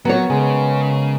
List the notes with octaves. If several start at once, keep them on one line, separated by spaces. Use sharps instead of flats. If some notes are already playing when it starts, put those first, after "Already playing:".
F#3 B3 A#4 C#5
C#3 G#3